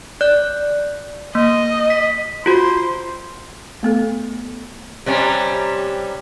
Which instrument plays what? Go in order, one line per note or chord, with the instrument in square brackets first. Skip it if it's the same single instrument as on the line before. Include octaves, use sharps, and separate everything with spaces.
[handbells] D5 F#6
[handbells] A#3 [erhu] D#5
[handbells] B6
[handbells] F4 F#4 [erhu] C5
[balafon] A3 B3 A4
[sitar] C3 G3 C#4